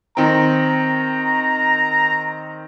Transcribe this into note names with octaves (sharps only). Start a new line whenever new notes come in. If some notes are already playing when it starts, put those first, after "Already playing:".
D#3 C4 A#5